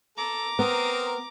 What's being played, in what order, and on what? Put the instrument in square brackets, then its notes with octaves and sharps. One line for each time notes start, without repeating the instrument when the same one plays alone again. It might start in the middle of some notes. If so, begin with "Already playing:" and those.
[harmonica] A4 [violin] A#5 D6
[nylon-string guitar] B3 [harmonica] C4 A#4 D#6